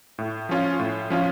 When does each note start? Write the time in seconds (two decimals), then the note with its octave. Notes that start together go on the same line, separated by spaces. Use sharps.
0.18 A2
0.49 F3 C#4 F4
0.79 A2
1.10 F3 C#4 F4